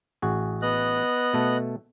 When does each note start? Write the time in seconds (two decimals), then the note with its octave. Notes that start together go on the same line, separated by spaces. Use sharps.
0.22 A1 F#4 G#4
0.62 B3 D#5 F#6
1.34 B2 A3 A4